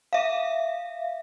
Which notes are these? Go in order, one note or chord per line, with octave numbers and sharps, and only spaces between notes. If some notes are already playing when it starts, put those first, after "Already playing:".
E5 F5